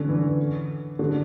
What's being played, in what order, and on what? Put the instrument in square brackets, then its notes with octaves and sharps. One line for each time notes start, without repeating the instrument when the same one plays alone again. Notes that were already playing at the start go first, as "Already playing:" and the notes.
Already playing: [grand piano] D3 C#4
E3
D3